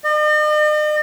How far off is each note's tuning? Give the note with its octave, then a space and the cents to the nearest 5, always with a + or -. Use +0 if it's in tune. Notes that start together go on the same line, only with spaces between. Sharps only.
D#5 -45